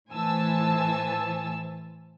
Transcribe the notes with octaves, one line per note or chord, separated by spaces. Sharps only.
A2 E3 C5 G#5 A5 E6